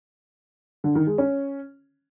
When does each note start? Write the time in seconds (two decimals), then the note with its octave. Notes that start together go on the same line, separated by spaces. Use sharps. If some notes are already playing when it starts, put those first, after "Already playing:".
0.84 D3
0.95 D#3
1.07 G#3
1.18 C#4